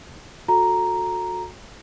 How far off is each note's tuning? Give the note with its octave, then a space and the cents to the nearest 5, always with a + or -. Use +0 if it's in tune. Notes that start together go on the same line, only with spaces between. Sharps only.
F#4 -25 A4 +0 A#5 +0